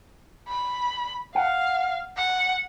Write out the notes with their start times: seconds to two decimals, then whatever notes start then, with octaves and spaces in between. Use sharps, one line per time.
0.47 B5
1.35 F5 F#5
2.17 F#5